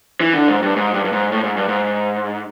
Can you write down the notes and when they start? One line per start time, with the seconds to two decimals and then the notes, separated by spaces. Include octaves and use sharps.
0.20 E3
0.34 D3
0.48 G#2
0.62 G2
0.76 G#2
0.94 G2
1.05 G2
1.13 G#2
1.32 A2
1.44 G#2
1.57 G2
1.69 G#2